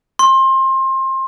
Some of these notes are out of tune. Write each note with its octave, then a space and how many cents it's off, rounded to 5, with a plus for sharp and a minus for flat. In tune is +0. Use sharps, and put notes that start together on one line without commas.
C6 +25